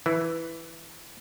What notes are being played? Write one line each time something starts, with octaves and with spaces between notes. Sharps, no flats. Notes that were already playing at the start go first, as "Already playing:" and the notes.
E3